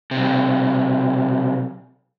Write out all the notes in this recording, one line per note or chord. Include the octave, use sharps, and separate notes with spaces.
B1 C3